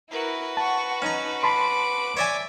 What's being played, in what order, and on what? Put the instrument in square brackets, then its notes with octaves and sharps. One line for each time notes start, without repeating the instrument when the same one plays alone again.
[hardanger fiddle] E4 A#4 [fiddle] F#4 B4
[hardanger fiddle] F#5 C#6 [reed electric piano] A5
[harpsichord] C#4 A#5 [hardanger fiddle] D#4
[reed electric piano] A5 B5 C6 [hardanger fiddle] D6
[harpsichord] C#5 D5 G#5 [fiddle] E5